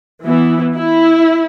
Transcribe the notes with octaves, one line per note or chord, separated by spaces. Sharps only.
E3 B3 E4
E4